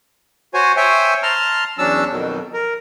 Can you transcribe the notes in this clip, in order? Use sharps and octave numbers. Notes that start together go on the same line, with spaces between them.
F#4 C5 C#5 G#5
C5 C#5 E5 G5 G#5
A5 A#5 C6 F6
E2 F#3 C#4 D4 A5 E6
F2 B2 D#3 F#3
A#4